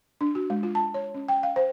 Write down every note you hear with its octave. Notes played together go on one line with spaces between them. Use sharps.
D4
F#4
G#3
F4
A5
C#5
C#4
G5
F5
C5